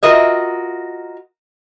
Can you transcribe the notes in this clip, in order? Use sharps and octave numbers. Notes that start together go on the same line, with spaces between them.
F4 F#4 A#4 D#5 E5